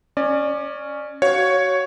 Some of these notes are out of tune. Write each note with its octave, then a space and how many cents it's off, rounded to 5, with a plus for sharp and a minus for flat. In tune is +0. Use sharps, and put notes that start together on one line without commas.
C#4 +0 D5 +25
F#4 +25 C#5 +0 F5 +25